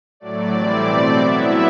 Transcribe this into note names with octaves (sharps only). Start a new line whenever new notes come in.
A2 F#3 A3 D5
A2 E3 G3 C4 E4
B2 A3 C4
F#3 B3 E4 E5